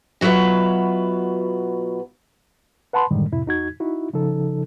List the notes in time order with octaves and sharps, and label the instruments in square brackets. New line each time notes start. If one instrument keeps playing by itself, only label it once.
[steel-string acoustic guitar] B2 F#3 F4 B4 E5
[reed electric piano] B4 F#5 A5 B5 C6
F#2 A2 D3 D#3 G3 G#3
F2 A2 C3 E4
E2 D#4 F#4 G#6
D#4 E4 F#4
C#3 F3 D#4 A4